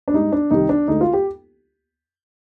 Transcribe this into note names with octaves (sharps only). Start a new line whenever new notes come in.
D4
G#2 G3 D#4
D4
C2 C3 D#3 G3 D#4
D4
D2 D3 G#3 D#4
F4
G4